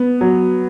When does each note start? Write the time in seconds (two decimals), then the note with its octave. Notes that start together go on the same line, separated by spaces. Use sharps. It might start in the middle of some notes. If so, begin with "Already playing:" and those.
Already playing: B3
0.21 F#3